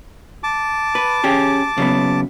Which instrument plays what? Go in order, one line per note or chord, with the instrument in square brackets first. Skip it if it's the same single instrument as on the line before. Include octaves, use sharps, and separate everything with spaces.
[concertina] A5 D6
[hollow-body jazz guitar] B4
C#4 G4 G#4
C#3 F#3 B3